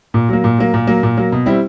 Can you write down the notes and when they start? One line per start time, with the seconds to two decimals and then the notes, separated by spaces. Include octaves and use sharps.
0.14 A#2
0.29 F#3 A#3
0.44 A#2
0.58 F#3 A#3
0.74 A#2
0.87 F#3 A#3
1.03 A#2
1.17 F#3 A#3
1.32 B2
1.46 G3 C4 E4